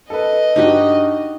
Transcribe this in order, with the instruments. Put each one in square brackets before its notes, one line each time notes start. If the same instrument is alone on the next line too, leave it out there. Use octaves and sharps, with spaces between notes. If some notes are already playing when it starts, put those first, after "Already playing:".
[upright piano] A4 B4 [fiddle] D#5
[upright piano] G2 [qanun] D#4 F#4 G4